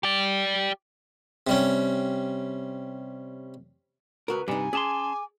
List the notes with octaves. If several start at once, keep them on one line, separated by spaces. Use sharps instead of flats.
G4 D5
C3 G3 C#4
C#2 F#4 A#4 B4
G2 C3 G3 D#4 G#5
C#4 G#4 A5 C6 D6